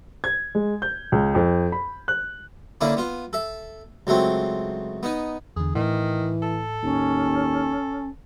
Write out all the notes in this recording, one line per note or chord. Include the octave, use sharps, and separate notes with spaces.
G#6
G#3
G6
C#2
F2
B5
F#6
D3 A#3 C#4 D4 E4
B3 F4
A4 E5
C#2 F#3 A3 C4
B3 D#4
E2 D3 G#4
A2 D#3 E3
A4
D#2 C#4